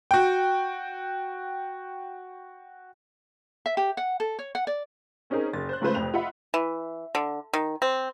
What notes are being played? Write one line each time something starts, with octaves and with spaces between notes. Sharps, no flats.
F#4 G5
E5
G4
F#5
A4
C#5
F#5
D5
C4 C#4 D#4 G#4 A#4
F#1 A6
C5 F#6
C#3 G#3 A3 F4 B4 C5
F1 F2 F7
F4 D#5 E5 F#5 B5
E3
D3
D#3
C4